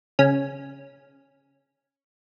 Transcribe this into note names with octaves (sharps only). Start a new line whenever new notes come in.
C#3 C#4